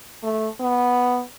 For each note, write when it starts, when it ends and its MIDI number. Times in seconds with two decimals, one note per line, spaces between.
0.23 0.47 57
0.60 1.22 59